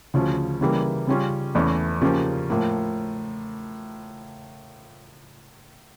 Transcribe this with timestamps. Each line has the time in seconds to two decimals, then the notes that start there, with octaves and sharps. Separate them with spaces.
0.14 D2 C#3 F3 C#4
0.61 C#3 E3 G3 A#3
1.07 C#3 G3 C#4 F4
1.55 E2 E3 A3 C#4
2.02 C#3 F3 A#3 C#4 G4
2.50 A2 F3 A#3